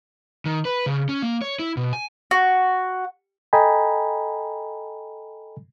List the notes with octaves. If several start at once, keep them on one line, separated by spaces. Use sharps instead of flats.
D#3
B4
C#3
C#4
A#3
C#5
E4
B2
G#5
F#4
A4 D#5 G5 G#5 A#5 B5